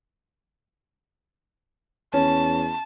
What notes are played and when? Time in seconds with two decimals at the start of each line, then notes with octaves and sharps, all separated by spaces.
2.14 E2 C#4 A5